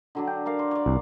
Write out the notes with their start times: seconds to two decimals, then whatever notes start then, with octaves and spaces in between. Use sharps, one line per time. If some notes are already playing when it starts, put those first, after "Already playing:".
0.15 D3 F#3 D4
0.28 G5
0.46 A#4 D5 F5
0.59 C5
0.71 C#5 D5
0.86 C2